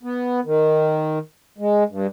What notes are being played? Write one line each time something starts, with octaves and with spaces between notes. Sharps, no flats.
B3
D#3
G#3
G2